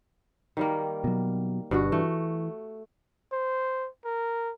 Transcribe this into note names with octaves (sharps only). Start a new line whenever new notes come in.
D#3 G3 A#3
B2 F#3
G1 G2 B2 F#4
E3 A3
C5
A#4